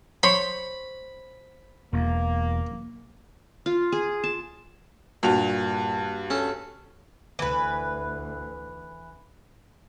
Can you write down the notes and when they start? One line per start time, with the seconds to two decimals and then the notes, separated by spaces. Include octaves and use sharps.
0.23 C5 C#5 B5
1.93 E1 E2 A#3
3.66 F4
3.92 G#4
4.24 A5
5.23 G2 A#2 F#4 F7
6.30 C#4 A4
7.39 D2 E3 B4